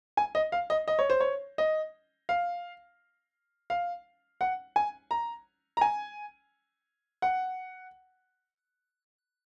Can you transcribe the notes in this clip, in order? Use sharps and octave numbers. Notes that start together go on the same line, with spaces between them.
G#5
D#5
F5
D#5
D#5
C#5
C5
C#5
D#5
F5
F5
F#5
G#5
A#5
A#5
G#5
F#5